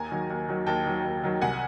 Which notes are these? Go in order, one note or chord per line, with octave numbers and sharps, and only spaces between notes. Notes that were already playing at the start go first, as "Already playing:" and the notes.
Already playing: D#2 G#5 A#5
D#3 F#3
D#2
D#3 F#3
D#2 G5 A5
D#3 F#3
D#2
D#3 F#3
C2 F#5 G#5